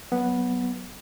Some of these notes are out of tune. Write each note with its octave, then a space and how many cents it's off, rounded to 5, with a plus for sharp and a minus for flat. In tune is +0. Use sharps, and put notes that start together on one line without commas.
F#3 +15 B3 -5